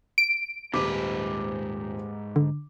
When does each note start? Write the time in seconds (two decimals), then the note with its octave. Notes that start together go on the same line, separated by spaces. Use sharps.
0.18 D7
0.74 D#1 G#2 B4 D6
2.36 D3